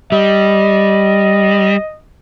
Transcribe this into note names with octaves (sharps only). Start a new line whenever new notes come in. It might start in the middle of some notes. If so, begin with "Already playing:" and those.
G3 D#5